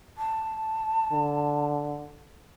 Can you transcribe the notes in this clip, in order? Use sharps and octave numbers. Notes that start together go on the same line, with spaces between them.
A5
D3